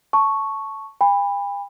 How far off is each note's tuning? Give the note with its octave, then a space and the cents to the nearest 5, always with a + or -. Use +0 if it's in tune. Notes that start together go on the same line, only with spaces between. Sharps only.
A5 +0 C#6 +0
G5 +45 B5 +0